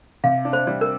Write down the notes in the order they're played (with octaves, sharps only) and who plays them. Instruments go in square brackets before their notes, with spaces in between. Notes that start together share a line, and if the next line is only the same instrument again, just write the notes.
[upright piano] C3 [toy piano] F5
[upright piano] D4
[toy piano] C5
[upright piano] G3
[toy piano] A#4